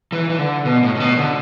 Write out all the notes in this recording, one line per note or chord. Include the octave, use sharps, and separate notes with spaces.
E3
E3
D3
B2
A2
A2
B2
D3